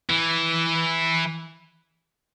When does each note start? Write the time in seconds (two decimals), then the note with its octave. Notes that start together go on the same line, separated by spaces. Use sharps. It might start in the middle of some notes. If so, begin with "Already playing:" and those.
0.09 E3